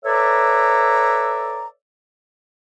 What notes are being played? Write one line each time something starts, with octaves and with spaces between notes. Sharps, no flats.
A4 B4 C#5 D5 E5 A#5